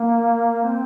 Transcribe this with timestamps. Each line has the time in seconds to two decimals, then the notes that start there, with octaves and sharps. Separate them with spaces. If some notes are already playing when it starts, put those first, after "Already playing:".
Already playing: A#3
0.64 C4